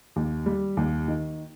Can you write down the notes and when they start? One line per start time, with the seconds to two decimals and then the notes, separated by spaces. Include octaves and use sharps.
0.16 D#2
0.46 G3
0.77 D#2
1.08 D#3